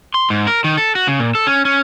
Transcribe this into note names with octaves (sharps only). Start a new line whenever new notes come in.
C6
G#2
A#4
D#3
A4
F#4
C#3
A#2
A4
C#4
C#4